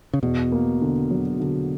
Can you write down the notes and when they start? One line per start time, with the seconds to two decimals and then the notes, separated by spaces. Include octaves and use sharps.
0.14 C#3
0.23 E2 B2
0.52 A#3
0.82 D3
1.11 F#3
1.40 D3